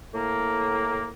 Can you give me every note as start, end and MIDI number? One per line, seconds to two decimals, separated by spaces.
0.14 1.09 45
0.14 1.09 58